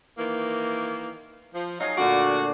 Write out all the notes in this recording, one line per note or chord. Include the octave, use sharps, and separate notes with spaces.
D#3 E3 A#3
F3
F#3 D#4 G#4 F5
D2 A#2 D3 F#4 D6